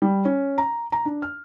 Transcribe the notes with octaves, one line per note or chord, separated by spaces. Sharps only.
G3
C#4
A#5
A#5
D4
F6